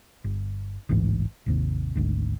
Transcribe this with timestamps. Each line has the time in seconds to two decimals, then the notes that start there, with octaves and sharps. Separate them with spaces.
0.24 G1
0.89 A1 D2 G#2 E3
1.46 G#1 D#2 C3
1.96 G#1 D2 G#2